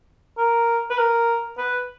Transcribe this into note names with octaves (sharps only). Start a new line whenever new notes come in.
A#4
B4
A#4
B4